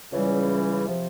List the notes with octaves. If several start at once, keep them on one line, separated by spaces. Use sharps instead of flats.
C#2 C#3 E3 G3
C3 F3